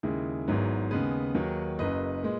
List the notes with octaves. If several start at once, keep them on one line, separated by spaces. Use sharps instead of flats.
D#2 C#3 G#3 E4 G#4
G#1 G#2 F#3 B3
D#2 C#3 G#3 B3 G#4 B4
D#2 D#3 F#3
F#1 F#2 C#3 B4 D#5
A#2 G#3